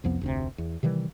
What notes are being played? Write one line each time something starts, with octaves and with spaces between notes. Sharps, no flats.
C2 F2 F3 B3
F1 D2 C3
E2
C3 D#3 E3 G3